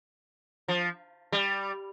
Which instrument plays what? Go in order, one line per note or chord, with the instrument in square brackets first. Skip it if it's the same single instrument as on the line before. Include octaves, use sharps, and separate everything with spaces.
[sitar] F3
G3